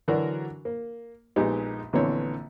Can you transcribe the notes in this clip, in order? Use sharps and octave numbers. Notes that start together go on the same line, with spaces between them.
D3 E3 F#3 D4 F#4 A#4
A#3
A#1 A#2 G#3 B3 D#4 G4
A#1 D3 E3 B3 C4 C#5